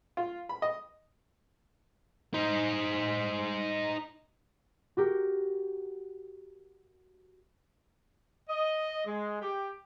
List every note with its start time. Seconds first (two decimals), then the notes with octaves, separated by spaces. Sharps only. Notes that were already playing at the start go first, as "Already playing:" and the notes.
0.17 F4
0.49 B5
0.62 D#5
2.34 D#4 C5
4.97 F#4 G4 A#4
8.49 D#5
9.06 G#3
9.41 G4